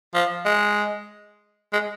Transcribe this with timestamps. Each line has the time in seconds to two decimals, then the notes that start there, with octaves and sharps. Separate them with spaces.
0.15 F3
0.46 G#3
1.73 G#3